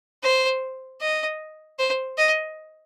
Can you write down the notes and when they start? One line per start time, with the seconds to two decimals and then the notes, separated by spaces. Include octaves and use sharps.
0.23 C5
1.01 D#5
1.79 C5
2.17 D#5